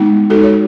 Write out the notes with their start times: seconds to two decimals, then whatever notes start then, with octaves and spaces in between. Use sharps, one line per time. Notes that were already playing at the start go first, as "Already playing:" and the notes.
Already playing: G#3 B3 D#4
0.30 G#3 F#4 A4
0.33 D#4
0.43 C#5